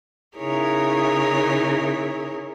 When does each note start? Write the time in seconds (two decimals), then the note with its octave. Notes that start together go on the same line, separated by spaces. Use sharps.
0.36 C#3 D#4 E4 G#4 A#4 C#5